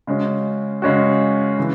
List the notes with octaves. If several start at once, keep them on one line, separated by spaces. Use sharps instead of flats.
C#3 G#3 C#4 F#4
C#3 G#3 C#4 F#4
C#3 E3